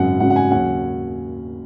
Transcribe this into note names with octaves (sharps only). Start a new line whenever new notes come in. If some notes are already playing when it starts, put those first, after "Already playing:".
Already playing: G#1 F#2 C#3 F#3 F#5
G#1 F#2 C#3 F#3 F#5
F#5
G#5
D#2 C#3 F#3 C#4 F#5